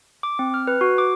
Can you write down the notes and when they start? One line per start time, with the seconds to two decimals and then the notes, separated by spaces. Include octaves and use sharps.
0.23 D6
0.39 C4
0.54 F6
0.67 B4
0.81 F#4
0.98 D6